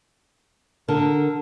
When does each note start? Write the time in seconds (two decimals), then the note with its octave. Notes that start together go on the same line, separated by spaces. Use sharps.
0.88 D3 A#4